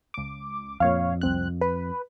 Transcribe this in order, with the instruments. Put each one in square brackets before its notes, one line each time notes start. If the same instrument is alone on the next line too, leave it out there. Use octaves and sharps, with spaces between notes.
[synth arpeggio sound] C#2 D6
[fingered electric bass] F2 [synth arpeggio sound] A#2 C#5 F5
[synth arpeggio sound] C2 C4 F#6
B4